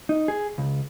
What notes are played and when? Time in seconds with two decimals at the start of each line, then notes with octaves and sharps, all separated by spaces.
0.09 D#4
0.28 G#4
0.58 C#2